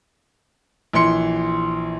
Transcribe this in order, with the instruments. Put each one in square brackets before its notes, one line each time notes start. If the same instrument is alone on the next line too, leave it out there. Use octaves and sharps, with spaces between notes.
[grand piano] A#1 E3 C6 C#7